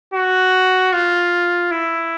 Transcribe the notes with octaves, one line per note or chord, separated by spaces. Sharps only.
F#4
F4
E4